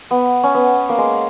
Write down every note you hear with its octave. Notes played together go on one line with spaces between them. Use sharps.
B3
C#4
B3
A#3
G#3